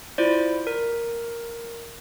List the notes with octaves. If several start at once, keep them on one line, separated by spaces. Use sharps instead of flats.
E4 F4 C5 D5
A#4